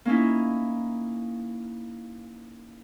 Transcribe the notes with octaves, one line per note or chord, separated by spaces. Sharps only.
A#3 C#4 D#4 E4